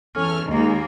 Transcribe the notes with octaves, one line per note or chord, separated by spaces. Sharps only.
E2 C#4 A4 F6
D#2 G#3 A#3 D#4